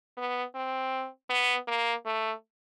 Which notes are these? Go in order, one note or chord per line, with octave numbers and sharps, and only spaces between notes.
B3
C4
B3
A#3
A3